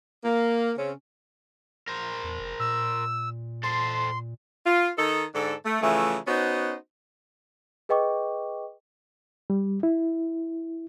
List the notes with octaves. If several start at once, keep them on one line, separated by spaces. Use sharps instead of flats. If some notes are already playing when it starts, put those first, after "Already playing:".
A#3
C#3 C4 C#4
A#4 C5
E2
F1
A#2 E6
A4 C5 C6
F4
D#3 D#4 A4
G#2 D3 A4
A3
C#3 E3 F3 A3
B3 C#4 D#4 F#4 C5
G#4 B4 D#5 G5 C#6 D6
G3
E4